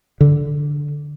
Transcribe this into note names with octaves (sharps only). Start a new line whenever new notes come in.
D3